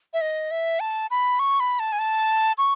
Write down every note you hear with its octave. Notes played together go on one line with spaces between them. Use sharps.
E5
D#5
E5
A5
B5
C#6
B5
A5
G#5
A5
C#6